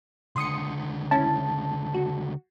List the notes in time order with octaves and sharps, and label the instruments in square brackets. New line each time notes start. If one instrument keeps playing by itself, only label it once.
[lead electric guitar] C#2 D3 [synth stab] C6 D#6 C#7
[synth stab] C#4 E4 [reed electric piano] A5
[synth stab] F#4